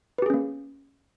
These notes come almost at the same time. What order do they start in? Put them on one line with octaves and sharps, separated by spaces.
B4 G4 G#4 C#4 A#3